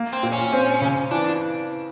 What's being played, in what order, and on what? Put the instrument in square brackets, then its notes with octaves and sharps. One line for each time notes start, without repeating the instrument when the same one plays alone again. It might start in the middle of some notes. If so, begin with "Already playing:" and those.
Already playing: [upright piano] A#3
[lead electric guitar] C4
[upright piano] A#2
[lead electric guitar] C#4
[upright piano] C4
C#3
[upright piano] E3 [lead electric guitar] D4